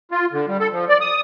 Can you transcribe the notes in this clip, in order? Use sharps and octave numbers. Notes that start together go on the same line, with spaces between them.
F4
D3
G3
A4
F3
D5
D#6